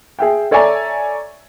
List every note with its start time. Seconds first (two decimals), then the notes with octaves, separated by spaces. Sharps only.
0.19 G#4 E5 G5
0.51 A4 C#5 D5 E5 G#5 A#5